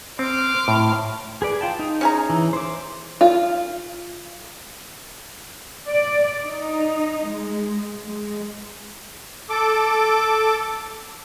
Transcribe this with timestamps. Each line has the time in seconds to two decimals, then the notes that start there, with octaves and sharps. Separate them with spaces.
0.19 C4 C6 D6 F6
0.68 A2
1.42 G#4 B4 D5
1.61 F4 G5 A5
1.79 D#4
2.01 C#4 G#4 A#5
2.30 E3
2.53 C5 D6
3.21 F4
5.88 D5
6.44 D#4
7.28 G#3
8.08 G#3
9.50 A4 D6